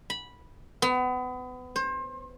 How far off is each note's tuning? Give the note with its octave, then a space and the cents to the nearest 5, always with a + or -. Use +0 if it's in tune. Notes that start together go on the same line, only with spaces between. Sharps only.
B5 -10
B3 +30
C5 +30